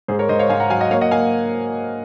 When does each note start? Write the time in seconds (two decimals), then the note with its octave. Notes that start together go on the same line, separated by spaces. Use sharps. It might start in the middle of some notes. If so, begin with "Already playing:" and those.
0.08 G#2 G#4 C5
0.19 A#4 C#5
0.29 G#2 C5 D#5
0.39 C#5 F5
0.49 G#2 F5 G#5
0.60 F#5 A#5
0.70 F#3 F5 G#5
0.81 D#5 F#5
0.91 A#3 C#5 F5
1.01 D#5 F#5
1.11 A#3 F5 G#5